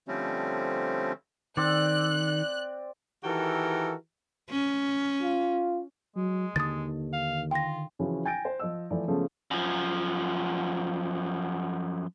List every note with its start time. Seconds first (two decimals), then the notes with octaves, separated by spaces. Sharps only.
0.08 D3 F3 G3 A3 C4 C#4
1.57 D#3 C4 D5 F#6
3.24 D#3 E3 F#4 G4 A4 A#4
4.50 C#4
5.22 F4
6.16 F#3 G#3
6.56 D#2 D3 D#3 D#6 A6
7.13 F5
7.51 F4 G5 A#6
7.99 C#3 E3 F3 C#4 F#4
8.25 G5 G#5 G6 A6 A#6 D7
8.45 C5
8.59 F3 D#5 E6
8.90 E3 F3 A3 D5
9.08 C#3 F3 G#3 A3 B3 C#4
9.51 F#2 F3